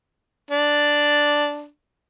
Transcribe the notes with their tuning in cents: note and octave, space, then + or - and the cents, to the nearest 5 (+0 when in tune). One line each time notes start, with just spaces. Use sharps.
D4 +0